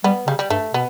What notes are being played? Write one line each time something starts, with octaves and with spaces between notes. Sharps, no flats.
G3 B3
C#3 G3
G3
G2 A3
B2 B3